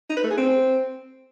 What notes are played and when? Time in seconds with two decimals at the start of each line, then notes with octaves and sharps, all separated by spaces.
0.10 D#4
0.17 B4
0.24 A3
0.31 G#4
0.38 C4